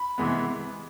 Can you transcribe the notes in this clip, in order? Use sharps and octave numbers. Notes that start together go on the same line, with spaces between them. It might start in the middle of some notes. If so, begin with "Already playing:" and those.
Already playing: B5
C3 E3 G#3 B3